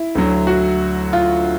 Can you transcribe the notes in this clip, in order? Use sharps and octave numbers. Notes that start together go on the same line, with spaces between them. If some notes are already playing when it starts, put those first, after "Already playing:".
Already playing: E4
D2 D3 F#3
F#4
F4